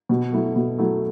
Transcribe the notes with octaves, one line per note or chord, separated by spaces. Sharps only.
B2
F#3 A3 E4
B2
F#3 A3 E4